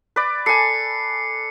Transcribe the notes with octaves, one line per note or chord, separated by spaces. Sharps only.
B4 D5
A4 G#5 C7 C#7